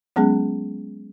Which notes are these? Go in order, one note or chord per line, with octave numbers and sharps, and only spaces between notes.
F#3 G#3 B3 C#4 G#4